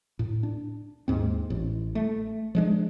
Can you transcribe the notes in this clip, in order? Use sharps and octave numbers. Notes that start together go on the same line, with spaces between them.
A2
D4
D#2 G#2 C4
A1
A3
F3 G#3 D4